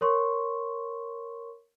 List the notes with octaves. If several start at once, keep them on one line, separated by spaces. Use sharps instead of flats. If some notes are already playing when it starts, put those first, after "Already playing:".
A#4 C#5 C6 C#6